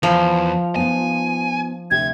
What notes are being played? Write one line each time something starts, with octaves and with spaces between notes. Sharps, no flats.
E2 F3
B3 D#4 F4 G#5
D2 C3 G4 G#6